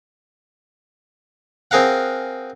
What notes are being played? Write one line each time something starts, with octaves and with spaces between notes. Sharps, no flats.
C4 G#4 A#4 F5 F#5